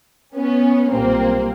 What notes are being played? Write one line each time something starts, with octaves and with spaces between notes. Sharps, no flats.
B3 C#4
B1 A#2 G3 A#3 C4